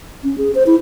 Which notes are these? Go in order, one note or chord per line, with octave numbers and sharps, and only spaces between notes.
C#4
G#4
C5
E4